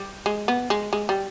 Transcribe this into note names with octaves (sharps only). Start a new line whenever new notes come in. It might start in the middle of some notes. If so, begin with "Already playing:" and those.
Already playing: G3
G#3
B3
G#3
G#3
G3